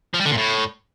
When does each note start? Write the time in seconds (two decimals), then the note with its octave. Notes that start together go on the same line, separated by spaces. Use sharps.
0.14 F3
0.20 G3
0.26 D3
0.31 A#2
0.37 A2